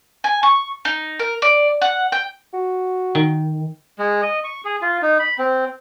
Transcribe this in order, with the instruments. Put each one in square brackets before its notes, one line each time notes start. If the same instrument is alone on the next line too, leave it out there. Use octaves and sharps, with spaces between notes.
[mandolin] G#5
C#6
D#4
A#4
D5
F#5
G5
[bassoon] F#4
[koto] D#3
[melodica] G#3
D#5
C#6
G#4
F4
D#4
B5
C4